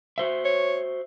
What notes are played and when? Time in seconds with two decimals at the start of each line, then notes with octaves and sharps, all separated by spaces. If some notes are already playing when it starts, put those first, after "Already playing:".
0.18 F#4 C5 E5
0.45 C#5